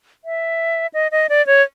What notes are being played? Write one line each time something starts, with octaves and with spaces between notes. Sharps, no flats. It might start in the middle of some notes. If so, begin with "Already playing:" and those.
E5
D#5
D#5
D5
C#5